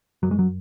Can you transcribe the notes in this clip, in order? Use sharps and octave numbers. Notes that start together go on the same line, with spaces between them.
F#2 F#3
G#3
F#3